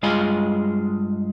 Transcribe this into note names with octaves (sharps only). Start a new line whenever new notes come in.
G2 G#3 F4 G#4 G#5